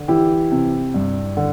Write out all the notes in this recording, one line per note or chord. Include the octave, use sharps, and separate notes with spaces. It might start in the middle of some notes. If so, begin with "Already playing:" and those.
Already playing: D3
E3 E4 G4
C3
G2
D3